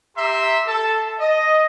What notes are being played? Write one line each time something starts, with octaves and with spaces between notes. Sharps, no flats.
G4 E5 A#5 C6
A4 A5
D#5